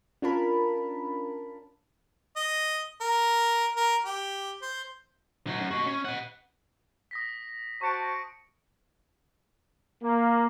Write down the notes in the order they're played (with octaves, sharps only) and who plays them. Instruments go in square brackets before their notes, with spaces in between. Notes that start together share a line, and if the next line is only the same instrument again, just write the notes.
[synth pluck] C#4 D4 F4 A#4 A5 B5
[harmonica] D#5
A#4
A#4
G4
C5
[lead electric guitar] F#3 D#4
F#2
F#4 D#5
C#4
D#5 F#5
[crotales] D#6 A#6 B6
[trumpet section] F#4 C5 A5 [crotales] C#6 C#7 D7
[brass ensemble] A#3